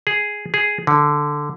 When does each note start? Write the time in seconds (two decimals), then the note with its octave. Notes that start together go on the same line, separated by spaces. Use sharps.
0.07 G#4
0.54 G#4
0.87 D3